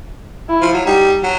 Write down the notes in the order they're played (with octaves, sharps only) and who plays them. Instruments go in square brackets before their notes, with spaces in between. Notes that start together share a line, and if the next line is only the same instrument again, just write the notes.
[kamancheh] E4
[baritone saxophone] F3
F#3
[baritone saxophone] G3 [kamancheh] D#4
[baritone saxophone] F#3